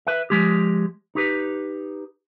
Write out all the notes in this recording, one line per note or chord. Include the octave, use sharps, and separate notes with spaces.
B4 E5
F3 G#3 G4
D#4 G4 B4